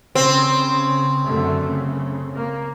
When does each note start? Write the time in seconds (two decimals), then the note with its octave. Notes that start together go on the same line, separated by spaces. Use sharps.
0.15 C#3 C4
1.24 F#2 D3 A3
1.68 C#3
2.36 A#3